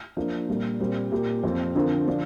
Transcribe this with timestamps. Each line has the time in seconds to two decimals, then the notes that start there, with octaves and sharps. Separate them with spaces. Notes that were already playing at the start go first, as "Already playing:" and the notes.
0.17 F3 A#3 D4
0.48 A#2 G3 A#3
0.80 A#2 G3 C4 A#4
1.12 A#2 A#3 G4
1.44 F2 F3 C4
1.75 D3 F3 C4 A#4
2.07 D3 F3 D4